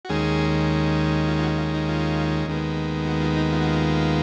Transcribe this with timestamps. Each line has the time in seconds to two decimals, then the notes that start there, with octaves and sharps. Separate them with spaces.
0.05 F#4
0.09 D#2 D#3 G#3 C#4 G#4
1.28 F4
1.39 F4
1.43 F#4
1.58 F4
1.74 D#4
1.89 F4
2.48 D#2 D#3 G#3 B3
3.07 F#4
3.22 F4
3.37 D#4
3.52 F4
3.61 F#4
3.66 F4